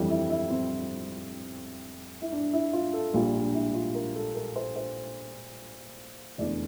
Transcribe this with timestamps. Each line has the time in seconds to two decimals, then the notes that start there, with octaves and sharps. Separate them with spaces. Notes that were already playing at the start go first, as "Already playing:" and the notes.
Already playing: G1 F2 E3 G3
0.10 E4
0.30 E4
0.50 C4
2.21 E4
2.32 D4
2.53 E4
2.73 F4
2.93 A4
3.14 A#1 A#2 G3 F4
3.34 D4
3.54 E4
3.74 F4
3.95 A#4
4.15 A4
4.35 A#4
4.56 C5
4.76 C5
6.38 F1 E2 D3 D5